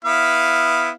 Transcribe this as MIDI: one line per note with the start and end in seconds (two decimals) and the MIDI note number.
0.05 0.90 59
0.05 0.90 64
0.05 0.90 77